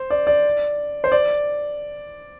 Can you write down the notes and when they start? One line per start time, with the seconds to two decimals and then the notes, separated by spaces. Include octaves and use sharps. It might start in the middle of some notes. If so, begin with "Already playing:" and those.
Already playing: C5
0.10 D5
0.27 D5
1.04 C5
1.12 D5